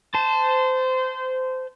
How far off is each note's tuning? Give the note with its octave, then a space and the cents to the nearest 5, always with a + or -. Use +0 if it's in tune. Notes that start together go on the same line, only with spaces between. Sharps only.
C5 -20 A5 +0